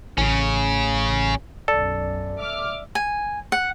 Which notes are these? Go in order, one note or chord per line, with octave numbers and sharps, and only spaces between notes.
A1 C#3 C#4
B1 F#2 A4 D5
E5 D6 F6
G#5
F#5